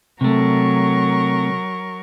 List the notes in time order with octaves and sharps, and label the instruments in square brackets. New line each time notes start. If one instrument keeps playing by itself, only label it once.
[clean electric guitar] C3 A3 [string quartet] F#3 A#4 C#6